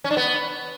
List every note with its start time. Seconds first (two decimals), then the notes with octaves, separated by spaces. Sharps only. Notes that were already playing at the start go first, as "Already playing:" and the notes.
0.04 C#4
0.11 D4
0.17 B3